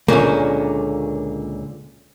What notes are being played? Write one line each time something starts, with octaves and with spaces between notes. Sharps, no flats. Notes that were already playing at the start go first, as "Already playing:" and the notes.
C#2 A#2 D3 A#3 C#4